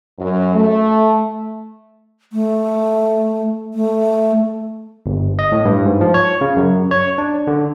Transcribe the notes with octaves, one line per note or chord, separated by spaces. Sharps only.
F#2
A3
A3
A3
G1
D#5
A2
G2
G#2
F3
C#5
C#3
F#2
C#5
D4
D3